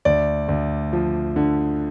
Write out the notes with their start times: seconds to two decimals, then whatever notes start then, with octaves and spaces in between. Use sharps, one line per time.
0.05 D2 D5
0.49 D2
0.93 F3
1.36 D3